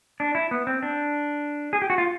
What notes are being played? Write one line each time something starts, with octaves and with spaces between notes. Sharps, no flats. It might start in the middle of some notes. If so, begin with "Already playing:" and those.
D4
E4
B3
C4
D4
G#4
G4
F#4
F4